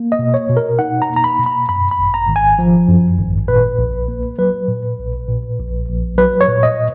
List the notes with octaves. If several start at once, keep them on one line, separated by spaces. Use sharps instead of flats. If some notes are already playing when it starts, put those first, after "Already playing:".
Already playing: A#3
D#5
B2
C#5
B2
A#4
D#4 F#5
A#5
A#3
A#5
B5
B2
B5
F#2 B5
B5
G#1
A#5
G#1
G#5
F3
F#2
G#1
A#2 B4
A#1
A#3
F#3 B4
A#2
A#1
A#2
A#1
A#1
F#3 B4
C#5
A#2
D#5